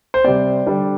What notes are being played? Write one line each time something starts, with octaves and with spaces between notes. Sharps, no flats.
C5
C3 G3 C4 D5
D3 G3 D4